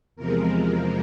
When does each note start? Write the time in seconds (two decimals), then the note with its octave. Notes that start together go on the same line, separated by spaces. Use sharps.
0.16 E2 C3 F3 G#3 A#4
0.51 A#4